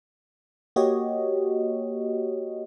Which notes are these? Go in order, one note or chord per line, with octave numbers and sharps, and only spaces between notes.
A#3 F#4 G4 C#5 D#5